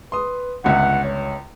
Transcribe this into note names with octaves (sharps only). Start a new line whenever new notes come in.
B4 C6 D#6
G1 C#2 E5 F#5
C#5